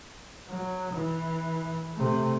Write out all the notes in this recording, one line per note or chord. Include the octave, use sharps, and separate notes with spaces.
F#3
E3
C3 A3